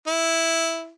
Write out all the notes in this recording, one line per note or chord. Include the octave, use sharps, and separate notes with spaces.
E4